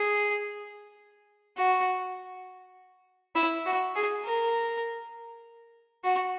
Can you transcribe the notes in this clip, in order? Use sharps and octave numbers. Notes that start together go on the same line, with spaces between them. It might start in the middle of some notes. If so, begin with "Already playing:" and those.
Already playing: G#4
F#4
E4
F#4
G#4
A#4
F#4